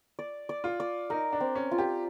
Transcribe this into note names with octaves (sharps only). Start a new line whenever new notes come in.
D5
D5
F4
D5
D#4 A#4
D4
C4
C#4
F4
G4